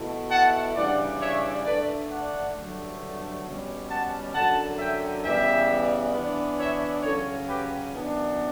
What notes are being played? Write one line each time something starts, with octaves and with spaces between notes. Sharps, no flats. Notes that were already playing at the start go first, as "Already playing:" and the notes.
Already playing: B2 A3 E4
F#5 A5
C#3 E3 G3 D4 D5 F#5
C#5 E5
D3 A3 D4 B4 D5
D5 F#5
G2 D3 F#3 A3
B2 G3 C#4
F#5 A5
F#2 D3 F#3 F#5 A5
E5 G5
C#3 E3 G3 B3 E5 G5
E3 B3 D4
C#5 E5
C#3 F#3 C#4 A4 C#5
G4 B4
F#2 E3 B3 D4